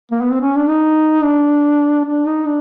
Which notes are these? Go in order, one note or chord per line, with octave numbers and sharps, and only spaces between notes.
A#3
B3
C4
C#4
D4
D#4
D4
D4
D#4
D4